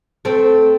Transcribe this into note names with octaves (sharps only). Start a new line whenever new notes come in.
A3 C4